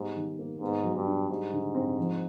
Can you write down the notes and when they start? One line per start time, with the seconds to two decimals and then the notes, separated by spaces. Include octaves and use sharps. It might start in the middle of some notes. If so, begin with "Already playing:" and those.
Already playing: G#2 G3 B3
0.16 D#3
0.39 A#3
0.61 G#2 B3
0.83 F#3
0.95 G2
1.07 D4
1.29 G#2 G3
1.53 D3
1.75 C4
1.98 F3